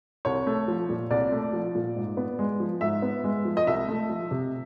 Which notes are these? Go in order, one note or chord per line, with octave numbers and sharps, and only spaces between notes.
C2 C#5
A3
F3
A#2
C2 D5
A3
F3
A#2
G#2
B3
G#3
F3
G#2 E5
B3
G#3
F3
D#5
C2 E5
A3
F3
C3